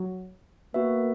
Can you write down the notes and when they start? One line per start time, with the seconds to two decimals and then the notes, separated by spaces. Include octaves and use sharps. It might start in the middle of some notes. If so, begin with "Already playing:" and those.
Already playing: F#3
0.74 A#3 B3 F#4 B4 E5